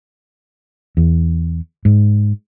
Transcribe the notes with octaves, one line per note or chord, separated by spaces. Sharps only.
E2
G#2